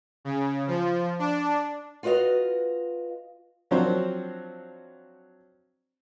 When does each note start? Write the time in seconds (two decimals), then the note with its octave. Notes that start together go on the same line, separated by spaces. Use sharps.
0.25 C#3
0.67 F3
1.19 D4
2.03 F4 F#4 B4 D#5 F5
3.71 F3 F#3 C4 D4 F#4 C5